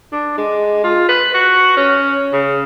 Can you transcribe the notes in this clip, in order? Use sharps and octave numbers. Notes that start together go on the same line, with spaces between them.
D4
G#3
F4
B4
F#4
C#4
C#3